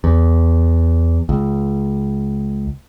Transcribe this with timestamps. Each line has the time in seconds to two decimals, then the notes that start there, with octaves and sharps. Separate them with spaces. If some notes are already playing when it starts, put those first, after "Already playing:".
0.04 E2
1.29 C#2